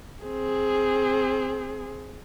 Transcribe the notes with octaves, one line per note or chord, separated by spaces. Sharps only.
C4 G#4